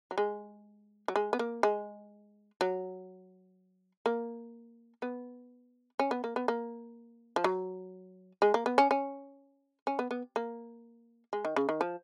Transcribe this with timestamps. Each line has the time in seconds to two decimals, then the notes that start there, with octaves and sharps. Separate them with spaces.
0.11 F#3
0.18 G#3
1.08 F#3
1.16 G#3
1.33 B3
1.39 A#3
1.63 G#3
2.61 F#3
4.06 A#3
5.02 B3
5.99 C#4
6.11 B3
6.24 A#3
6.36 B3
6.48 A#3
7.36 F3
7.44 F#3
8.42 G#3
8.54 A#3
8.66 B3
8.78 C#4
8.91 C#4
9.87 C#4
9.99 B3
10.11 B3
10.36 A#3
11.33 G#3
11.45 D#3
11.56 C#3
11.69 D#3
11.81 F3